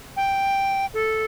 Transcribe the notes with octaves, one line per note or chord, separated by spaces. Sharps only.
G5
A4